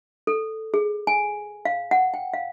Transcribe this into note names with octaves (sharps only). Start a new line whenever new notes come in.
A4
G#4
G#5
F5
F#5
G5
F5